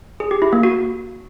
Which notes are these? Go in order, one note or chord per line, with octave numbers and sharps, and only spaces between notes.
G#4
G4
E4
A#3
F#4